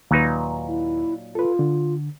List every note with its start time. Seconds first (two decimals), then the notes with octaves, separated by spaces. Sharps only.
0.11 D#2 A#2 F#3 D#4 B4
0.67 E4
1.35 F4 A4 B4
1.59 D3